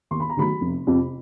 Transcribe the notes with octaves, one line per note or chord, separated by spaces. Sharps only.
D#2 C6
B5
A#5
D#3 F#3 A3 B5
F1
F2 C3